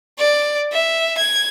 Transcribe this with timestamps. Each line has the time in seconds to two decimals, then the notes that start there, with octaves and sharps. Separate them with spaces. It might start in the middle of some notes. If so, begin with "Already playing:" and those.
0.19 D5
0.72 E5
1.18 G#6